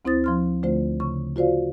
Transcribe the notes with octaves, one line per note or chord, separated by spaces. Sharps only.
D2 C4 E4 C5 D#6 A6
F3 C6 F6
D2 D3 A3 F4 C5
C#3 C#6
F4 F#4 C5 D5 F5